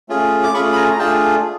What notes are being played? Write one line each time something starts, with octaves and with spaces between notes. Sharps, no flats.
A3 C#4 F4 G#4
D6
A3 C#4 F4 G#4 B5 C#6
B5
G#5 A#5
A#5
A3 D4 F4 G#4 G5 A5